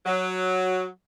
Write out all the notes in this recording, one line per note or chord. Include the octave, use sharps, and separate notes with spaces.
F#3